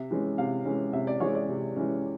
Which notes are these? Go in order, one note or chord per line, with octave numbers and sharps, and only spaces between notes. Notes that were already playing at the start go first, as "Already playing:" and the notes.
Already playing: C3 E5
E3 G#3 C#4
C3 F5
E3 G#3 C#4
C3 E5
D5
E3 G#3 C#4 C#5
D5
C3
E3 G#3 C#4